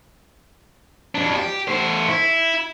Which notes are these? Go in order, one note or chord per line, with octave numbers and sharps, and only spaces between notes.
F2 D4
G4
A3 C5
E4